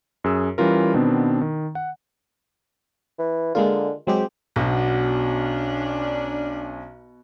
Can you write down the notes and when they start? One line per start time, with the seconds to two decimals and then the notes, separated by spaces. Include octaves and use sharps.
0.24 F#2 G#4 E6
0.58 E3 G3 C#4 F4 A#4
0.94 B2 D#3 B3 C4 D4
1.41 D#3
1.75 F#5
3.18 E3
3.55 D3 G#3 A#3 F4
4.07 F#3 G#3 C4 G4
4.56 B1 B2 C#4 D4